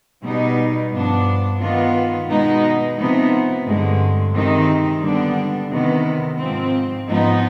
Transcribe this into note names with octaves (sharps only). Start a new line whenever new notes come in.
B2 G3 B3 D#4
G2 F3 B3 D4
D#3 B3 F4
B2 G#3 B3 D#4
C3 F3 B3 D#4
G2 D3 G#3
C3 D#3 G#3 C4 D#4
D3 G3 B3 D4
C3 D#3 B3
G#2 F3 C4
G#2 F3 B3 D#4